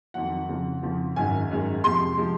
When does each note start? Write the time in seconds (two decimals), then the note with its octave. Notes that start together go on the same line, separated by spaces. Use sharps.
0.14 F2 D#3 F#3 F#5
0.49 F2 C#3 F3
0.83 F2 C#3 F3
1.16 G#1 F#2 D#3 G#3 G#5
1.50 G#1 F#2 D#3 G#3
1.84 F2 C3 F3 G#3 C6
2.17 C3 F3 G#3